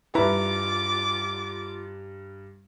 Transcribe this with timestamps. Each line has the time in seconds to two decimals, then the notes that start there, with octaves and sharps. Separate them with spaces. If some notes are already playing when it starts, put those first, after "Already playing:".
0.15 G2 E4 F4 B4 A#5 B5 D6